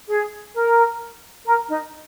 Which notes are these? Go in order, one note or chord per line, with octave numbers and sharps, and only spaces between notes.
G#4
A#4
A#4
D#4